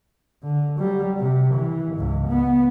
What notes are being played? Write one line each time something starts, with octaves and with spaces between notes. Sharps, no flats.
D3
F#3 G3
C3
E3
C#2 G#2
B3